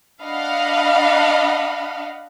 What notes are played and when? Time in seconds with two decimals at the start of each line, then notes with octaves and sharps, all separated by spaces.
0.23 D4 D#5 F5 F#5 B5